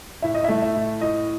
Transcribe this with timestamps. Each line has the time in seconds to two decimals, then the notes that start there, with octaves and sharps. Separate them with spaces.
0.22 A2 E5
0.34 D#5
0.44 A3 E5
0.62 E5
0.76 A2
1.01 A2 D#5